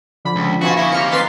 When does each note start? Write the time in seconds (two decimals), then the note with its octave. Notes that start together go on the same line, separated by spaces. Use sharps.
0.25 D3 F3 B5
0.36 C#2
0.61 F2 B2 F4 F#4 G#5 B5 C#6
0.77 A#3 D#4 E4
0.92 C3 F6 C#7
1.11 F2 B4 C6 A6 B6